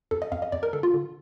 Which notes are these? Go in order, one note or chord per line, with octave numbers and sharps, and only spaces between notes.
F2 A4
D#5
F2 F5
D#5
F2 D5
A#4
D3 A4
F4
D3